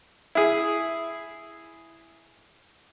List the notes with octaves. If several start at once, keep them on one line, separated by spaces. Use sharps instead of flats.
E4 G#4